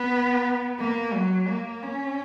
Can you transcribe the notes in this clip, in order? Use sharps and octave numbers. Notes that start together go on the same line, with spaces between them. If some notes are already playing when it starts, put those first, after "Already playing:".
Already playing: B3
A#3
F#3
A#3
C#4